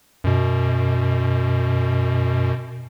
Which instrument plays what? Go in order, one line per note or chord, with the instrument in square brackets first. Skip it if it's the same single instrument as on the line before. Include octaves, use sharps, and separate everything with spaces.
[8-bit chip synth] F#2 B2